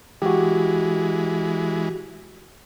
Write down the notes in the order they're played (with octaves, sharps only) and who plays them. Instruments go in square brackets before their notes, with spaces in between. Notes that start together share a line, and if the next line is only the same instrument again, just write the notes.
[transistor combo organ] E3 G#3 [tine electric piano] F#4 G4